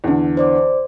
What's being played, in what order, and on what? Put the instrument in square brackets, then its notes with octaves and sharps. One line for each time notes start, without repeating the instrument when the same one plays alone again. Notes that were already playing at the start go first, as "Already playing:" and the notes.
[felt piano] E2 D3
[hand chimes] C5 D5 D6